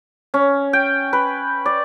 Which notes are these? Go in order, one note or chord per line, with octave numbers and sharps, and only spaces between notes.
C#4
G5
B4
D5